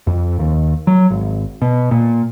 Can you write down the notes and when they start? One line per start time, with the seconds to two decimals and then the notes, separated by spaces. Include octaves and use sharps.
0.07 F2
0.39 D#2
0.87 F#3
1.10 G#1
1.62 B2
1.91 A#2